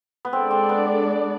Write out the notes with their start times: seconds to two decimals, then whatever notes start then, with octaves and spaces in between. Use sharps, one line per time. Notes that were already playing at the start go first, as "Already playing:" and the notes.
0.25 B3
0.32 G#3 C4 D4 A4 D5
0.51 C4
0.69 B3